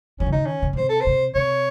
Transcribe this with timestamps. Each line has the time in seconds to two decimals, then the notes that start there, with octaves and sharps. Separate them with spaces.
0.20 F#3 C#4
0.26 C#3
0.32 D#3 D#4
0.46 C#4
0.62 C#3
0.73 C#3
0.77 C3 C5
0.89 A4
1.01 C5
1.06 C3
1.35 C3 C#5